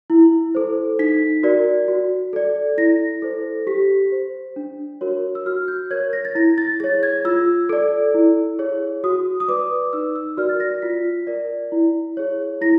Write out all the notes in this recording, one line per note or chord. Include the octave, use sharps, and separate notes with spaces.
E4
A4 C5
D#4 B6
F#4 A#4 D5
F#4
A4 D5
E4 A#6
A4 C5
G4 B6
C5
D4
F#4 A#4 C#5
E6
F#4 F6
G6
A#4 C#5 G#6
A#6
A6
E4 A#6
A6
G#4 C#5 A6
G#6
F4 E6
A4 D5
E4
G#4 C#5
F#4 D#6
D#6
B4 D5 D6
D#4 E6
E6
F#4 A#4 D5 F6
A6
A#6
F4 B6
A#4 D5
E4
G#4 C#5
E4 A#6